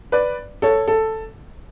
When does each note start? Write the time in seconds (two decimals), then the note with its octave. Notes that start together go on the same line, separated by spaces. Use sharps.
0.12 B4 D5
0.62 A4 C#5
0.88 A4